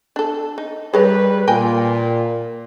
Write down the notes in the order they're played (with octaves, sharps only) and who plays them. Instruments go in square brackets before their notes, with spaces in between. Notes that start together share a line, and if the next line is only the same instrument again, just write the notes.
[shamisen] D4 A4
D#4
[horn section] G3 B4 [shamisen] G#4 A#4 C#5
[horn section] A#2 [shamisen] A#4 G5 G#5